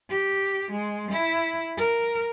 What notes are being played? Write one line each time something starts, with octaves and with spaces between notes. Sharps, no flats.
G4
G#3
E4
A#4